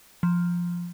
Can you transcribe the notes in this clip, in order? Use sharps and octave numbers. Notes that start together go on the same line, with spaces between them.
F3